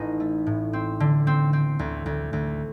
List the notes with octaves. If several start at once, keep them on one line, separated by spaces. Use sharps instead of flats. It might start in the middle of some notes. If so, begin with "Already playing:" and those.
Already playing: A1 D#4
A3
A2
C4
D3
C4
C4
D2
D2
D2